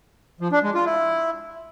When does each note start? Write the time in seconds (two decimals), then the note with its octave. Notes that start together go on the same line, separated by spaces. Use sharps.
0.41 F3
0.52 D4
0.63 G#3
0.74 F4
0.86 E4